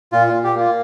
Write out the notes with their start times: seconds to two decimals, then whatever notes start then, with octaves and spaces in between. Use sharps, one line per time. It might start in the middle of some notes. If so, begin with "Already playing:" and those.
0.12 A#2 F4
0.28 F4
0.34 A#2
0.44 G4
0.55 A#3 F4